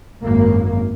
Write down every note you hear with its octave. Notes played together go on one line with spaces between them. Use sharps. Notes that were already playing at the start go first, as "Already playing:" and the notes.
G#1 F#2 A#3